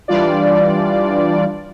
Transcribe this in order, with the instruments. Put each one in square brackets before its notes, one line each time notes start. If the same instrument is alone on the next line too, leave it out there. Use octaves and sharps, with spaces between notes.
[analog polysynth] E3 G3 D4 F4 D5